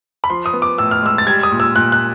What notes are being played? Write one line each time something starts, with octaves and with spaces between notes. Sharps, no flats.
B5
F3 C6
D#6
B3
D6
A2 E6
F6
G#3 E6
A6
G3 G#6
D#6
A#2
E6
A#2 F#6
F#6